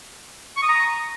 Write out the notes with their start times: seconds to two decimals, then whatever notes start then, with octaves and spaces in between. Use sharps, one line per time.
0.57 C#6
0.63 D#6
0.69 A#5